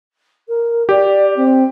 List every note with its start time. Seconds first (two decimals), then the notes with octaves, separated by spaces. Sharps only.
0.48 A#4
0.89 G4 D5
1.36 C4